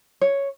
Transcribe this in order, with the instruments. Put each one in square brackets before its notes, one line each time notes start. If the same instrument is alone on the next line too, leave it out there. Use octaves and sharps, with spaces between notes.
[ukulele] C#5